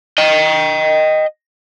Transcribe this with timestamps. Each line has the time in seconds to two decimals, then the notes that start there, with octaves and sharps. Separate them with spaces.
0.18 D#5 G5